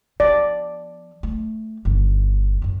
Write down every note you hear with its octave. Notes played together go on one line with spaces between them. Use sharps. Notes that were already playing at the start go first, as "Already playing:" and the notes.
F3 B3 D5
A3
G1 D#3
F#2 C#4